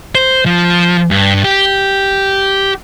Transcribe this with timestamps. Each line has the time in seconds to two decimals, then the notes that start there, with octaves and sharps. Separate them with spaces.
0.15 C5
0.46 F3
1.11 G2
1.44 G4